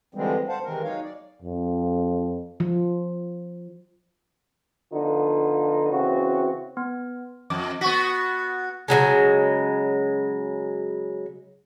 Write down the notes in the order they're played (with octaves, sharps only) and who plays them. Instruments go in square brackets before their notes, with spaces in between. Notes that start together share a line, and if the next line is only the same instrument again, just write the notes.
[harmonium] D3 E3 F3 G3 G#3 C4
C5 F5 F#5 A5
C3 D#3 E3 G#3 C4 A#4
F#3 G#3 D#4 C#5 F5
D5
[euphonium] F2
[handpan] F3
[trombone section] D3 F3 B3 D#4 F4
C#3 E3 C4 F#4
[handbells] B3
[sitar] F2 [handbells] D6
[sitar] B3 F#4 [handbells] C#6 B6
[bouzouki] C#3 F3 F#3 G#3